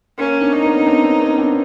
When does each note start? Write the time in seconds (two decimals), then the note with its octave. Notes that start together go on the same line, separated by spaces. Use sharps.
0.18 A#3 C#4
0.41 C4 D4
0.53 D#4
0.64 B3 C#4
0.87 C4 D4
1.04 C4 D4
1.21 B3 C#4
1.38 C4 D4